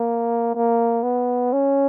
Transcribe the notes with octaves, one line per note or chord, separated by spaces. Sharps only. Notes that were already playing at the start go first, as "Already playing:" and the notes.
Already playing: A#3
A#3
B3
C#4